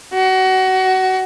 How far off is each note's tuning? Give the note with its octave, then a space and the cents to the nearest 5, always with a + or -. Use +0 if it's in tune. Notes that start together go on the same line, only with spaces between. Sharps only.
F#4 +25